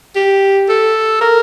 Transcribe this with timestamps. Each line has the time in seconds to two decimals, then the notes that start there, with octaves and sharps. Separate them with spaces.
0.15 G4
0.69 A4
1.21 A#4